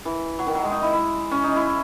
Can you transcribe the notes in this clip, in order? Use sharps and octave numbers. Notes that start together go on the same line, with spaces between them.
E3
F#3
D#3
F#3
G#3
D#4
E4
E4
C#4
D#4
E4